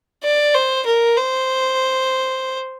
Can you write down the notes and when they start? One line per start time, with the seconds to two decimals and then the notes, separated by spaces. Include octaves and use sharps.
0.23 D5
0.54 C5
0.86 A#4
1.17 C5